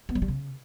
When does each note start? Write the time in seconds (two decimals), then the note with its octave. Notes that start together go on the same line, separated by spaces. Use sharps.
0.09 B3
0.15 F#3
0.22 G3
0.28 C#3